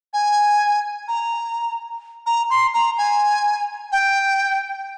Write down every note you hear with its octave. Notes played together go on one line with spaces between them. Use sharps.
G#5
A#5
A#5
C6
A#5
G#5
G5